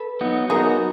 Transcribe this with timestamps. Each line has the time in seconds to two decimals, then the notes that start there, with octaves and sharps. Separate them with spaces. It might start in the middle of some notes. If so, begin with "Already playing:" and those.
Already playing: A4 B4
0.21 F#3 B3 D#4 F#4
0.50 F#3 B3 D#4 F#4 G#4 A#4